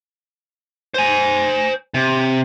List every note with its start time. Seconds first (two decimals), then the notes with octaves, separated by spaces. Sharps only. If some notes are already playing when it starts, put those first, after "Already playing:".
0.94 C5 G#5
1.94 C3